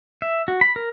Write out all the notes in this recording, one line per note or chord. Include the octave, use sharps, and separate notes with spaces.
E5
F#4
B5
A#4